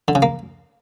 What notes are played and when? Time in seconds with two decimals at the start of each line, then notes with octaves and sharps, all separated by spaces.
0.08 D3
0.15 C#3
0.22 A#3